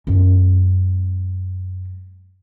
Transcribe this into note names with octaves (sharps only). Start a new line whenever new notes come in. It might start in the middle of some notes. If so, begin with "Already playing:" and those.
F#2 G#3